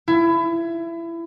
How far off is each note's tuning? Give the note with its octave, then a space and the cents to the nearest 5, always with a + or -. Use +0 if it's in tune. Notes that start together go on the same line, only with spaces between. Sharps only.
E4 +25